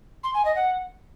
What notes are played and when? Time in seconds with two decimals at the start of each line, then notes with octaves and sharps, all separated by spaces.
0.23 C6
0.34 G#5
0.45 D#5
0.56 F#5